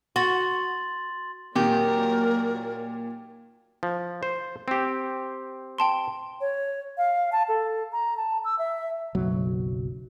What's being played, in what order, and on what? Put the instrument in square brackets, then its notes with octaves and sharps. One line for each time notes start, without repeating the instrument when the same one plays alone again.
[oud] F#4 [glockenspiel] C6 A6 F#7
[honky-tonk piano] A#2 [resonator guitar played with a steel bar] D#3 G4 [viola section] F#3 A#3 D5 [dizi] A#4
[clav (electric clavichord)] F3
C5
C4 G4
[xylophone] G5 A5 C6
[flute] C#5
F5
A5
A4
A#5
A5
E6
E5
[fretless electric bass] F#1 B1 F#3